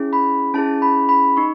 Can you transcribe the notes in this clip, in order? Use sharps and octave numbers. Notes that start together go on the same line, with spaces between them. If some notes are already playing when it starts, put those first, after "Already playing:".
Already playing: C#4 E4 G#4
B5
C#4 E4 G#4 A5
B5
B5
D#4 C#6